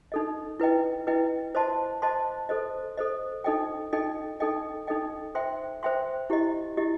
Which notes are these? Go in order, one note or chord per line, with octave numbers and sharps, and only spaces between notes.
D#4 A4 D#5
E4 B4 D#5 G5
E4 B4 D#5 G5
C5 D#5 A5 C6
C5 D#5 A5 C6
A4 C5 D#5
A4 C5 D#5
D#4 A4 D#5 G5
D#4 A4 D#5 G5
D#4 A4 D#5 G5
D#4 A4 D#5 G5
C5 E5 G5 C6
C5 E5 G5 C6
E4 G4 D#5
E4 G4 D#5